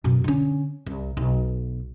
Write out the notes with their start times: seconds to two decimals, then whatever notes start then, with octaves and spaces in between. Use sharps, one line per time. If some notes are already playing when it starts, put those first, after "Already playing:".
0.04 F#2 B2
0.24 D3 C#4
0.86 C2
1.17 B1